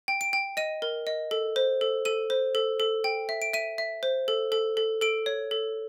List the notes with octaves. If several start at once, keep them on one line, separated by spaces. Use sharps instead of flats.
G5
D7
G5
D#5 D#7
A#4
D#5
A4
C5
A4
A4 D#7
C5
A4
A4
G5
E5
D7
E5 D#7
E5
C5
A4
A4
A4
A4 D7
C#5
A4